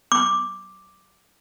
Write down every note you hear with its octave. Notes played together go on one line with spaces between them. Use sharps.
D6